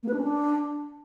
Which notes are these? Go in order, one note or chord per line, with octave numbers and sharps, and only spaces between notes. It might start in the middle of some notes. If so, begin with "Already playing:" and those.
A#3
B4
D4
C#4
D4